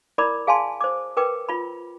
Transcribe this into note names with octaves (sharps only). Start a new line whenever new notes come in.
E4 A#4 D5 B5 D6
G#4 F5 G#5 A5 C6
C5 D6
A#4 B4 G5 D6
F4 B5